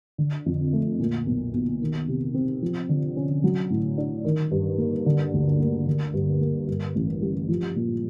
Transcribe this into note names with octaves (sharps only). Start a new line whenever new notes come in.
D3
F2
A3
A#2
B1
B1
D#3
C3
C4
F3
D3
C#4
F#3
A2
D4
D#3
G2
A#3
D3
D2
A#3
D3
G2
A#3
G2
A1
G3
F3
A#2